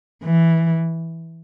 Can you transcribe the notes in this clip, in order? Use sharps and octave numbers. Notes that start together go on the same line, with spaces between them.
E3